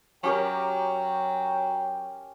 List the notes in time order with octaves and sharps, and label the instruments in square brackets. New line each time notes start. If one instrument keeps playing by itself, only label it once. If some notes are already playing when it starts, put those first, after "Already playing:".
[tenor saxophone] F#3 [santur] C#4 G4 A#4 [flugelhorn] G5